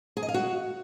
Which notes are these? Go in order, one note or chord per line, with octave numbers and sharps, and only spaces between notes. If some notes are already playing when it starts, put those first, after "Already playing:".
G#4
D#5
F5
F#4